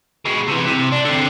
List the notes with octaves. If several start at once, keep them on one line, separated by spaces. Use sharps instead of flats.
B2 G#3
C3 E3
C3
D4
D3 C4